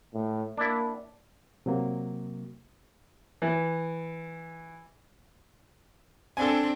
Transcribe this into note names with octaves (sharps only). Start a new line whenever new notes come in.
A2
A#3 D4 E4
C3 F#3 A#3
E3
C4 D4 A4 G#5